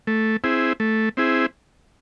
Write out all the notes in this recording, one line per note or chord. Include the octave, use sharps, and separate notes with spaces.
A3
C4 E4 G#4
A3
C4 E4 G#4